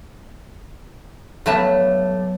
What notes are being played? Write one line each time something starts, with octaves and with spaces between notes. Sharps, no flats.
G2 F#3 A3 B3 A5